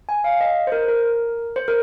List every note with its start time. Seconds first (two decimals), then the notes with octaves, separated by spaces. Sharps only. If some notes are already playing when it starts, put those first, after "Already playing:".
0.09 G#5
0.24 F5
0.41 D#5
0.67 C5
0.72 A#4
0.88 A#4
1.56 C5
1.68 A#4